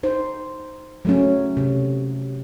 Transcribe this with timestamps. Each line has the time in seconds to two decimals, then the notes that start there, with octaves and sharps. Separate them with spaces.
0.03 D#4 C5
1.05 F#3 A3 C#4
1.57 C3